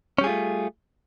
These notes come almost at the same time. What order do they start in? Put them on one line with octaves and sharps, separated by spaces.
C#4 G3 G#4 F4 A3